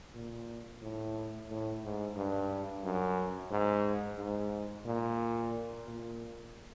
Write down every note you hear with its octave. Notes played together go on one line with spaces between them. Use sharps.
A#2
A2
A2
G#2
G2
F#2
G#2
G#2
A#2
A#2